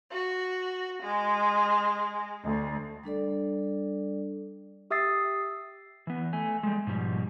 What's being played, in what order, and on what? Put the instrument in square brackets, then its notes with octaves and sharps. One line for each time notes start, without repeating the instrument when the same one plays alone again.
[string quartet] F#4
G#3
D2
[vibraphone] G3 D4 A4 D5
[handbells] G4 E5 D#6 E6 A6 C7
[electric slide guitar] E3 B3
A3 G#5
G3 G#3
G#2 B2 F3 G3